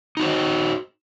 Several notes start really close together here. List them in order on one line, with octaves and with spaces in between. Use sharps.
D#4 F#4 C5 D#5